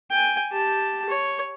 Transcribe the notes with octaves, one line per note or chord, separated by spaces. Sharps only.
G5 G#5
G4 A5
C#5